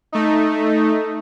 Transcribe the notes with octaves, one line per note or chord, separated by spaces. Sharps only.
A3 D#4